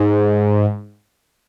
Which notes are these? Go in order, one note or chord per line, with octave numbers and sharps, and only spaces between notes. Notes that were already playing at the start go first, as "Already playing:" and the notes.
Already playing: G#2